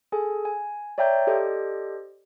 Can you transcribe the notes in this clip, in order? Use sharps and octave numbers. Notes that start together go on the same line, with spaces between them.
G#4 A4 G#5
G#5
C#5 D5 E5 G5 A#5 G6
G4 A4 C5 D5 D#5